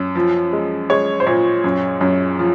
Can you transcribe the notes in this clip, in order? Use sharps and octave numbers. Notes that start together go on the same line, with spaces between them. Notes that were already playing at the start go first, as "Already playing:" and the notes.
Already playing: F#2
F3
G#3
G#3 C#5
C5
A#2 C#5
F#2
F#2
F3